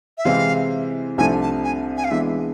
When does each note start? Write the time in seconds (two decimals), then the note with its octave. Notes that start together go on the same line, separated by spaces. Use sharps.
0.18 E5
0.25 C3 E3 G#3 C4 E4 F5
1.18 C2 C3 F3 A3 D4 G#5
1.42 A5
1.64 G#5
1.97 G#5
2.04 F5
2.11 E3 G#3 B3 D4 E5